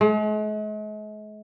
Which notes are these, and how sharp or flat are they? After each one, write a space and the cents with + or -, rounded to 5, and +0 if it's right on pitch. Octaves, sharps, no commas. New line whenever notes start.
G#3 +45